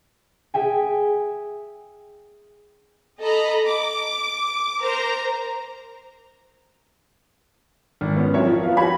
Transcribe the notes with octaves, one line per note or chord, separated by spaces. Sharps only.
G#4 E5 G5 G#5
A4 D#5 A#5 B5
D6
A#4 C5 A#5
G#1
B3 C#4
F#3 C4 A#4 C#5 E5
F3
B3 F5
F#4 G4 C#5 G#5 B5